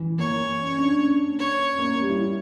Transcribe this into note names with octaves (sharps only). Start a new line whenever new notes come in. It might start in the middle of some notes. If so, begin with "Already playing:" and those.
Already playing: E3
A#3 C#5
C#4
C#4
D4
C#4
C#5
C#4
A#3
G3
E4